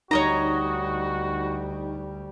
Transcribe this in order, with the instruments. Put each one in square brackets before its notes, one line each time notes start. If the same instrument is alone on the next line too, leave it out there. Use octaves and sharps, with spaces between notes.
[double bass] D2 G3 [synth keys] D#4 [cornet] F#4 [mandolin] C#5 D#5 A#5